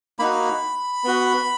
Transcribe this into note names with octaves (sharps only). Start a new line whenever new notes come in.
A#3 D#4 F#4 B5
B3 F#4